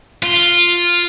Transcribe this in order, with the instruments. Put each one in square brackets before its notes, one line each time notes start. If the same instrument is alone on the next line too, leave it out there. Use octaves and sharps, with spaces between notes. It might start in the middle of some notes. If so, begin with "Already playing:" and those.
[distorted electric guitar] F4